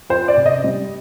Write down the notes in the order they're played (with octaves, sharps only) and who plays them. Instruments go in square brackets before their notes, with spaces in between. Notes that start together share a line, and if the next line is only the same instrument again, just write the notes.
[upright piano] F2 C5
D5
C3
D#5
G3